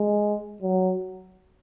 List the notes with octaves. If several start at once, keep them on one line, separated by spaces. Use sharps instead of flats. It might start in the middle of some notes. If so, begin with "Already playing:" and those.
Already playing: G#3
F#3